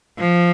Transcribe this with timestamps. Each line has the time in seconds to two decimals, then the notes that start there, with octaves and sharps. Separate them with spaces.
0.18 F3